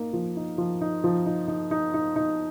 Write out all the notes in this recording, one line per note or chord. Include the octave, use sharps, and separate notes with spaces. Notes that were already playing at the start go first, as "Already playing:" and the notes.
Already playing: A#3 D#4
F3
D#4
F3
D#4
F3
D#4
D#4
D#4
D#4
D#4